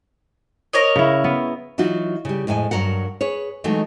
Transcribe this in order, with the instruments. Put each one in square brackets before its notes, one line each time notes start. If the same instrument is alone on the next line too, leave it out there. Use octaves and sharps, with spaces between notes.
[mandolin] A#4 C#5 D#5
[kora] C#3 E4
B3
[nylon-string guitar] E3 F#3 D#4 F4 F#4
C#3 G3
F2 A2 G#3 G5 G#5
G2 F#3 A#4 F#5
G#4 B4 C#5
E3 F#3 G#3 A3 D#4